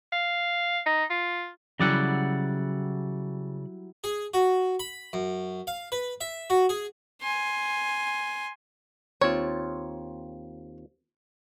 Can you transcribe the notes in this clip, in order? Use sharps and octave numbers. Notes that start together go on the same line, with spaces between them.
F5
D#4
F4
C#3 F#3 G3 E4 D5 F#5
G#4
F#4
B5
F#2
F5
B4
E5
F#4
G#4
G#5 C6
D#2 C4 F4 C#5